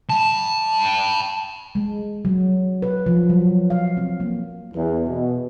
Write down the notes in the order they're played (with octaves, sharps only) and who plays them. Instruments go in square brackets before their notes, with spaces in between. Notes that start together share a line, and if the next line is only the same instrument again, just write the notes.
[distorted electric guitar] G5 A5
[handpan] G#3
F#3
B4
F3
F#3
F5
C4
A#3
[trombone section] E2
B2